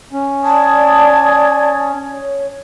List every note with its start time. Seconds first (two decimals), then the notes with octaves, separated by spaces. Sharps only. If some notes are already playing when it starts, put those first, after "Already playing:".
0.13 C#4
0.44 D5 A5 D#6 G#6
2.12 C#5